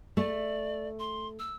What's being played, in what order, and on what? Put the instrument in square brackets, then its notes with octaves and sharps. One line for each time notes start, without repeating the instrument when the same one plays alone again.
[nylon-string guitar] A3 [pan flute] D5
[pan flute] C6
E6